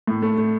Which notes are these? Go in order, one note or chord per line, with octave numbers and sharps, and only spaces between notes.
A2
A3
A3